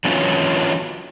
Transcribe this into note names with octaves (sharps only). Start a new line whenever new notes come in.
D3 E3 F#3 B3 C#4 F4